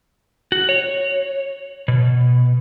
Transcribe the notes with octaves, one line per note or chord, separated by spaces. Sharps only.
F#4
C#5
B2